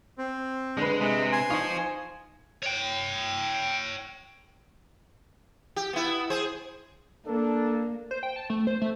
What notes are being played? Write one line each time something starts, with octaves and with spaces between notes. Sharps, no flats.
C4
D3 G#3 B4
C3 G#3
G#5 C6
D#4 F4 C5 C#6
C#5 G5
G4
B3 E4
G#4 C5
A#3 D4 A4 A#4
C5
G5
A5
A3
C5
A3